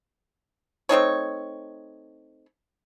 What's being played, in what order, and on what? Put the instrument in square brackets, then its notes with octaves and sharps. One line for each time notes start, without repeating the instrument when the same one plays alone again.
[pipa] A3 C4 D#4 C#5